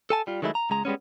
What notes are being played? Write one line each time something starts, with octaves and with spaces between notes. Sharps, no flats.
A4 G#5 A5
G3 F4
D#3 F#3 G#3 A3 E4
A#5
C#2 G#3 A#5
G3 G#3 B3 C#4